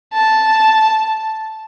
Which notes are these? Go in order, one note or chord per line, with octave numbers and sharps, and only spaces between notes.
A5